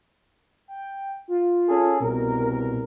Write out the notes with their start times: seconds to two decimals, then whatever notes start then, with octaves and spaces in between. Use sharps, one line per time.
0.68 G5
1.28 F4
1.67 C#4 G#4 A4
2.00 C2 B2 A#4